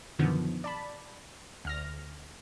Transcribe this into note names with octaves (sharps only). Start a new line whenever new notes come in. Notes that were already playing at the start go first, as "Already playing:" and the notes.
F#2 B2 D3 D#3 F3 B3
D5 A5 B5
D2 F6 A#6